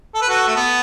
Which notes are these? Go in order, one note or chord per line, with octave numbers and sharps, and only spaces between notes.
A4
B4
F#4 A4
A3
B3